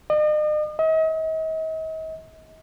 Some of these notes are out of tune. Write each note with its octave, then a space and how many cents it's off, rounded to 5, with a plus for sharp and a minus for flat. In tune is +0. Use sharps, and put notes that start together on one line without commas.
D#5 -45
D#5 +40